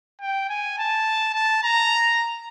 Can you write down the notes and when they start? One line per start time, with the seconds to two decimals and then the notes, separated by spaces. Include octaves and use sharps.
0.21 G5
0.49 G#5
0.78 A5
1.34 A5
1.63 A#5